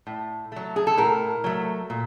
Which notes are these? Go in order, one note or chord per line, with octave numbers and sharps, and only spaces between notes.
A2
F#3 A3
G#4
A4
A2 A#4
F#3 A3
A#2